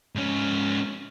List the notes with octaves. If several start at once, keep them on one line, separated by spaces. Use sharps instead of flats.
G#2 C#4